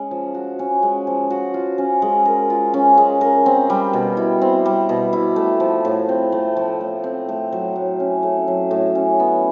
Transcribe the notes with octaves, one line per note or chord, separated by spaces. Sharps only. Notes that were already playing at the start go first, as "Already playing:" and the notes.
Already playing: G#3 C#4
F3
F#4
C#4
G#3
F3
F#4
F4
C#4
G#3
A#4
F4
C#4
G#3
A#4
C4
G3
B2
E4
C4
G3
B2
E4
A3
F3
A2
C4
A3
F3
A2
C4
A3
F#3
A2
C#4
A3
F#3
A2
C#4
B3